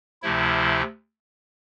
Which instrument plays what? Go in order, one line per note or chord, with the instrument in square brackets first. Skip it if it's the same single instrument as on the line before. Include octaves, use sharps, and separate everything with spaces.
[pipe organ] D2 C3 F3 A3 E4